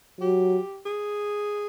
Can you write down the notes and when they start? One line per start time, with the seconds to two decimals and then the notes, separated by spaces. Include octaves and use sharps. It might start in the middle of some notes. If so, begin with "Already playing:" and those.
0.20 F#3 G4
0.86 G#4